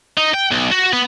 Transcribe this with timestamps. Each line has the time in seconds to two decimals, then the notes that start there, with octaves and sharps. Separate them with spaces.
0.17 D#4
0.34 G5
0.52 B1
0.72 F#4
0.93 B3